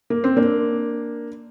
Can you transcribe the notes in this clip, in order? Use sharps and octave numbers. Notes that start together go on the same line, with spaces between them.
A#3
C4
A#3 D4